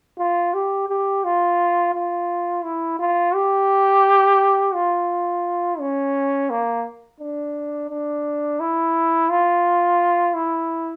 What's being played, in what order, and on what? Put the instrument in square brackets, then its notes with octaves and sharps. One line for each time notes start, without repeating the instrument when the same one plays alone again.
[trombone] F4
G4
G4
F4
F4
E4
F4
G4
F4
C#4
A#3
D4
D4
E4
F4
E4